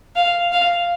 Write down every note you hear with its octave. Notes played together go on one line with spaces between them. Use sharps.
F5
F5